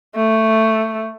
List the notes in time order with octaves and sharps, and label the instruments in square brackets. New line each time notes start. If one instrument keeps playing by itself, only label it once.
[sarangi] A3